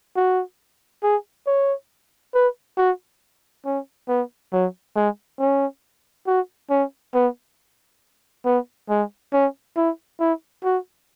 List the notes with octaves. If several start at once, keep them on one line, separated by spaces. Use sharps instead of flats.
F#4
G#4
C#5
B4
F#4
C#4
B3
F#3
G#3
C#4
F#4
C#4
B3
B3
G#3
C#4
E4
E4
F#4